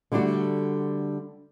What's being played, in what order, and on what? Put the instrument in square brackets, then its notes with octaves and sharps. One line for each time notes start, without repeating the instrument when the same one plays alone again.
[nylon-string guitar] D3 G3 A3 D4 F#4